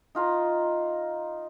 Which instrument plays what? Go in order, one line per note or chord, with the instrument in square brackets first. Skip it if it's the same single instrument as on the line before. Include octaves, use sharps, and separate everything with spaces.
[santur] D#4 F4 A#5